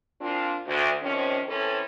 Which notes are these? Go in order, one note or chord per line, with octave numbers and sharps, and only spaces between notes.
A#2 C4 D4 F4
D2
C3 D#3 F3 C4 C#4
E3 C4 C#4 A4